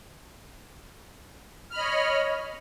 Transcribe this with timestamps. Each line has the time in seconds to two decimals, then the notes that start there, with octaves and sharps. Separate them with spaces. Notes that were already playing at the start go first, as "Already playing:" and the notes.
1.71 F6
1.74 B5
1.77 D#5
1.81 C#5